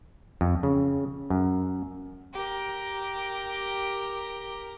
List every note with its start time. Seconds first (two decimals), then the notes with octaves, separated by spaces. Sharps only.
0.41 F2
0.63 C#3
1.30 F#2
2.33 G4 A#4